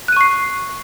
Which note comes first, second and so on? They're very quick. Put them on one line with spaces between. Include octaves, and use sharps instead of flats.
F#6 D#7 C#6 C7